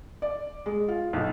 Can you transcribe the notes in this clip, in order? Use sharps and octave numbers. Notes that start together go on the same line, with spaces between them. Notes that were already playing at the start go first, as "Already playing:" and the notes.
D5
G#3
F4
B1